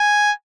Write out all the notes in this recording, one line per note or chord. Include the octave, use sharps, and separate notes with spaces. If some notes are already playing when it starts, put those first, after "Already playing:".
Already playing: G#5